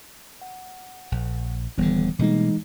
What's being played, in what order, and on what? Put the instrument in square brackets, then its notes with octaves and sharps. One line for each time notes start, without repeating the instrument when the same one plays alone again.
[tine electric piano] F#5
[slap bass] A#1
[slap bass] D#1 D3 [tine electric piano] E3 G3 B3
[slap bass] B2 G3 A#3 [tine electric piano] E3 G#3 D#4